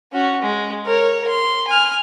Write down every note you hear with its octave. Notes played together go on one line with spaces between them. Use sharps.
C#4 F#4
G#3
A#4 C#5
C6
G#5 F6